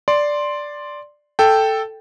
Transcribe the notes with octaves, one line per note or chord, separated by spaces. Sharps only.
D5 C6
A4 G5